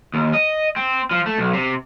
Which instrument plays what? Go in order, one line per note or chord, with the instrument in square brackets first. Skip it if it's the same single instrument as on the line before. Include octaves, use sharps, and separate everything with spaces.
[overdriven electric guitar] D#2
D#5
C4
F3
A3
B1
C3